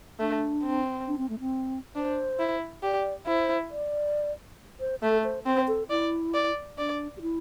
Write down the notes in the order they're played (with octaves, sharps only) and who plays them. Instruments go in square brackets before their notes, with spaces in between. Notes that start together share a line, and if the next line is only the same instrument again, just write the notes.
[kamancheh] A3 [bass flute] D4
[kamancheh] C4
[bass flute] D4
C4
A3
C4
[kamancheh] D4 [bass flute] C5
[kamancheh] E4
[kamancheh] G4 [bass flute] D5
[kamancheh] E4 [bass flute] C5
[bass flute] D5
C5
[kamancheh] A3 [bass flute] A4
[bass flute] C5
[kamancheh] C4 [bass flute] C5
[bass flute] A4
[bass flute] E4 [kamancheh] D5
[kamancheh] D5
[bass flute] D4 [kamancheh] D5
[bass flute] G4
E4